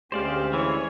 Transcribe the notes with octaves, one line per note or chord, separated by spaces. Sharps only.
D2 G#3 C#4 G4 C5 D5 F5
E3 C#5